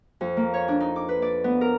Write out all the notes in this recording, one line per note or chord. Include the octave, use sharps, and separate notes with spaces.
F2
A#3
C#5
D4
D#4
D6
B4
D5
B3
A#4